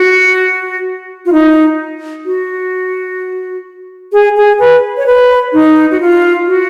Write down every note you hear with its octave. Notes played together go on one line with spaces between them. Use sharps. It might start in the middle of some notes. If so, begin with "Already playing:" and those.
Already playing: F#4
F4
D#4
F#4
G#4
G#4
B4
C#5
B4
D#4
F#4
F4
F#4